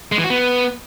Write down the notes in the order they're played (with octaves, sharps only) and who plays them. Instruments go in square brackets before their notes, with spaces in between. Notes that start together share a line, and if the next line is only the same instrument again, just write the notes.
[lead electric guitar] G#3
E3
F#4
B3